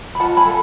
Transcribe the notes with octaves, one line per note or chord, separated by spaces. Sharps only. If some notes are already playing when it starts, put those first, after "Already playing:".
B5
F4 F#5 A5
G#5 B5
A4